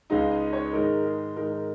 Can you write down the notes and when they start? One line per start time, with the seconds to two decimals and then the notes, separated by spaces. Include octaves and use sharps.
0.10 C#2 C#3 G#3 D#4 F5
0.31 D#5
0.53 C#5
0.73 G#2 D#3 G#3 D#4 A#4
1.05 G#4
1.36 G#2 D#3 G#3 D#4 A#4
1.52 A#4